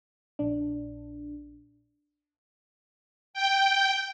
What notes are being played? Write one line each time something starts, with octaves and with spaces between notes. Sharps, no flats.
A#1 D4
G5